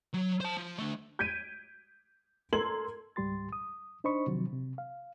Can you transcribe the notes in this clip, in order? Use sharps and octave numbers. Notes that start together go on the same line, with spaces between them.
F#3
C5 A5
F3
D3 A3
G6 G#6 B6 D7 D#7
A4 A#4 C6 G#6 F#7
C#2 G#2 G3 G4 C6 A6
D#6
D4 D#4 C5 D#5 B5 C#6
C3 D#3 F3 F#3
C3
F5